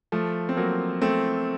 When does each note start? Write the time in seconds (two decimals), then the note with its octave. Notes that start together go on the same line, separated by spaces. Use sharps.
0.12 F3 A3
0.49 C4
0.57 F#3 A#3
1.02 A3 C4